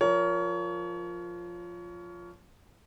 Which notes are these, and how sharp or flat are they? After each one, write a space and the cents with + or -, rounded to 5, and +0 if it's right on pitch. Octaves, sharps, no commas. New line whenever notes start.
F3 +0 A#4 +0 C#5 +30